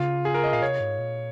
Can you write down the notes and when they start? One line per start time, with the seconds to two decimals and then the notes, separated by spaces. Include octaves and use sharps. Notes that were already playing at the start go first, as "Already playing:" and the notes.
Already playing: C#3 F4
0.25 G#4
0.34 A#4
0.44 D#5
0.53 A#2 F5
0.62 C3 C#5
0.80 G#2
0.99 A#2